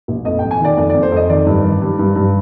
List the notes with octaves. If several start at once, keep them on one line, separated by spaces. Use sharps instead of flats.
A#1
F2 D#5
F2 G5
G#5
D#3 D5
F2 D5
F2 D5
C5
F2 D#5
D#3 D5
G2
D#3
G2
G2
G2